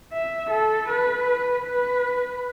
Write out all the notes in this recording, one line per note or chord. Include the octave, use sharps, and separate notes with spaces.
E5
A4
B4
B4